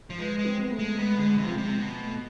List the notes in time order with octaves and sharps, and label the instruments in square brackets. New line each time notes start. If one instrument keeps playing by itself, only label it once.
[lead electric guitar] F3
[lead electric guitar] G#3 [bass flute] B4
[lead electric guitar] G#3
[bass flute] C4
B3
A3
[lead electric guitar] G#3
[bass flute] G#3 [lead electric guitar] B3
[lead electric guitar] D3 [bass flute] G#3
[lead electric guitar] C3 [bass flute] F3
[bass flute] A3
[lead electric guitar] C3 [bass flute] G#3
[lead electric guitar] B2
[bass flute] A3